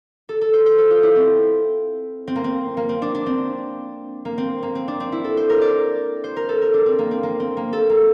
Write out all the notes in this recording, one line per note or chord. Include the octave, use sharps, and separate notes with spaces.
A4
A4
C5
C5
A4
F4
E4
C4
C4
A#3
C4
A#3
C4
D4
D4
C4
A#3
C4
A#3
C4
D4
C4
E4
A4
C5
A#4
D5
C5
A#4
A4
A#4
D4
C4
A#3
C4
A#3
C4
A#3
A4
A#3